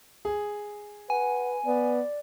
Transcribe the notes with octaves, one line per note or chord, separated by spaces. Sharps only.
G#4
B4 F#5 G#5
B3 D5